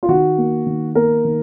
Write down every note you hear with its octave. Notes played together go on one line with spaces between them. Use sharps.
F4
D#3 F#4
A#3
D#3
A#3 A#4
D#3